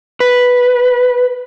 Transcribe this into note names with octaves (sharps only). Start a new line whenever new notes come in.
B4